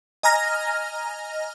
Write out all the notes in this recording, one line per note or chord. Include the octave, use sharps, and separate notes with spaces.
D#5 G#5 A#5 F6 A#6